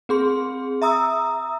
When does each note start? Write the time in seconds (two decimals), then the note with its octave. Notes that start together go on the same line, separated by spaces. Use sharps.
0.09 C4 G#4 C6
0.82 E5 A#5 D#6 E6